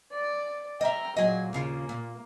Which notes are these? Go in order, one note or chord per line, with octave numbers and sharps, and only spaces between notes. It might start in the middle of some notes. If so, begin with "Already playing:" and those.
D5
D#5 E5 G5 A#5 F6
A#2 F#3 G#4 D#5
D#2 C#3 A#3 F4
A#2